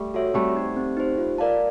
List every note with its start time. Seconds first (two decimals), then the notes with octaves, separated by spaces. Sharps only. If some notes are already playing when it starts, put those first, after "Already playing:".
Already playing: G3 A3
0.14 F#4 A4 C#5 E5
0.34 G3 A3 C4
0.55 D#4 G4 C5
0.76 C4
0.97 D#4 G4 C5
1.18 F4
1.38 A#4 D5 F5 A5